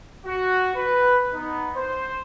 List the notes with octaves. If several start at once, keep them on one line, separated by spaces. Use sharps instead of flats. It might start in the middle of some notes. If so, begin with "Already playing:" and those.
F#4
B4
B3 D#4
C5